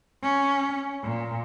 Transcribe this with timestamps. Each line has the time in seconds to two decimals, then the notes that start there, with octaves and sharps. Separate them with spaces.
0.22 C#4
1.03 A#2